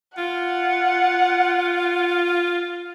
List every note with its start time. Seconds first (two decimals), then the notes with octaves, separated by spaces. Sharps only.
0.18 F4 F#5